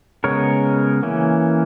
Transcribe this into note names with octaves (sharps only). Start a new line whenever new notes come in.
C#3 G#3 B3 A#4 C#5
E3 A#3 C#4